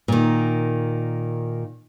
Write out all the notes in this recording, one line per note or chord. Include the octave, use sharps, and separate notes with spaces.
A#2 D#3